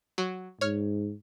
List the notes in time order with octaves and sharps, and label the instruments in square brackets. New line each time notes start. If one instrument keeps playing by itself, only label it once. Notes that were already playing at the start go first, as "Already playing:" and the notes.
[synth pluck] F#3
[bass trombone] G#2 [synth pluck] C#5 F6